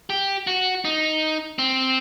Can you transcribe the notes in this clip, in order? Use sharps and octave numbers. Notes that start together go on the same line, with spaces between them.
G4
F#4
D#4
C4